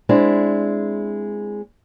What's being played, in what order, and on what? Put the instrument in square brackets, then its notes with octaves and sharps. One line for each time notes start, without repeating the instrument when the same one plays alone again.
[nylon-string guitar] G#3 C4 D4 E4